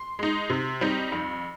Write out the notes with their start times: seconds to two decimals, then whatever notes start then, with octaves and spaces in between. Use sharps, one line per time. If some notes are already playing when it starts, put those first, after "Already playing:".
Already playing: C6
0.19 G#3 D#4
0.50 C3
0.81 G3 C4 D#4
1.12 F2